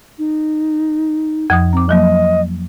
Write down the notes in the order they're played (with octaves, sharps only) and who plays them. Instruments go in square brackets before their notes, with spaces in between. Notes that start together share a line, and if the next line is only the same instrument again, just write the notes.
[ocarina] D#4
[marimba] F2 F3 D#6
[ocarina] C4 [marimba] A#5 D6
[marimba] F3 F#3 A#3 [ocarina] D#5